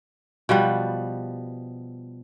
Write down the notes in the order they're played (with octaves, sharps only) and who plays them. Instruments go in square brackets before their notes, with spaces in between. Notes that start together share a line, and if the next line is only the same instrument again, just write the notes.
[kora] B2 F3 G3 B3